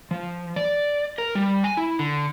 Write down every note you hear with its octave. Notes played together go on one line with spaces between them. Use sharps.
F3
D5
A#4
G3
G#5
E4
D3